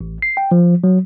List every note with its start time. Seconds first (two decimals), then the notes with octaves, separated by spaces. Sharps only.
0.01 A1
0.22 C7
0.37 G5
0.51 F3
0.84 F#3